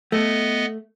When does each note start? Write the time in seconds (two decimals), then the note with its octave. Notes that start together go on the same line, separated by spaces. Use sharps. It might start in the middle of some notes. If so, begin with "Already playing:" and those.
0.12 A3 B3 D#5